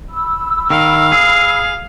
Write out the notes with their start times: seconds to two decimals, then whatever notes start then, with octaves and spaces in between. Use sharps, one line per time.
0.10 B5 E6
0.70 D#3 F5
1.12 G#4